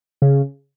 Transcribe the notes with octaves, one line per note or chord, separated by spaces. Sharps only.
C#3